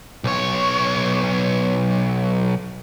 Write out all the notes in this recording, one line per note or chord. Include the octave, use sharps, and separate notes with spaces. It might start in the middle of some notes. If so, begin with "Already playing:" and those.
B1 C#5